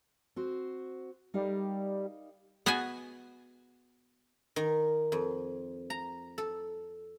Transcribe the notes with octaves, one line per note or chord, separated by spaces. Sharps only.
C4 F#4 C5
G3 D#4 A#4 F5
B3 F#4 G#4 D#5 G#5
D#3
F2
A#5
A4